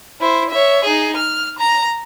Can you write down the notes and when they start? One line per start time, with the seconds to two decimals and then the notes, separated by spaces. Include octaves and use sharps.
0.20 E4 C5
0.50 C#5 E5
0.85 D#4 G#4
1.16 F6
1.59 A#5